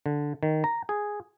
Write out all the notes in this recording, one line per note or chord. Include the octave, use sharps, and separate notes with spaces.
D3
D#3
A#5
G#4